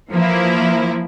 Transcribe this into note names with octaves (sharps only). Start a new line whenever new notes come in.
E3 F3 A#3 E4